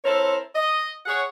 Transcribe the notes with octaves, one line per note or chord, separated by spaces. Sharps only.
C4 E4 A4 A#4 C5 C#5
D#5
G#4 C#5 F#5